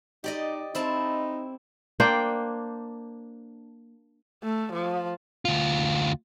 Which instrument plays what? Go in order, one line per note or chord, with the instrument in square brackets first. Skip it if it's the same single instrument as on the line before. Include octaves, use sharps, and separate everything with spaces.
[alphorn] D#4 [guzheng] G4 D5 D#5
[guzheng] C4 E4 A5 [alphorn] D#4
[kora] A#3 D4 C5 G5
[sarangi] A3
F3
[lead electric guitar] D2 F4